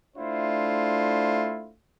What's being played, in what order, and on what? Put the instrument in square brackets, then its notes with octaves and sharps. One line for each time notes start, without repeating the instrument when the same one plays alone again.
[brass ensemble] A3 D4 E4 F4 C5